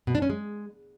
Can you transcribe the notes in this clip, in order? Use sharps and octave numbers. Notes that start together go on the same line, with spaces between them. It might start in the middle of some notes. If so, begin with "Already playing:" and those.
B2
D4
C#4
G#3